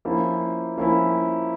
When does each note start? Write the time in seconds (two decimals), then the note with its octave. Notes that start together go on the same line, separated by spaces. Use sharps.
0.05 F3 A#3 C#4 E4
0.78 F3 A#3 C#4 E4